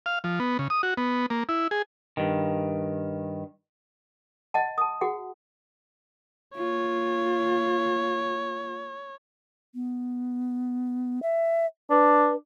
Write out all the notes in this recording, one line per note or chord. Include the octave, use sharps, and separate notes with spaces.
F5
F3
B3
C#3
D#6
F#4
B3
A#3
E4
G#4
G2 D#3
D#5 F#5 A5
A5 D#6
F#4 G#4 F#5
A#3 F4 C#5
B3
E5
D4 B4